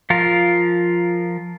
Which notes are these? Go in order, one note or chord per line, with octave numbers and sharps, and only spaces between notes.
F3 F4 A#4